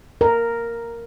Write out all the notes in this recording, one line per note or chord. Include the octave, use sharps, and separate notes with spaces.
A#4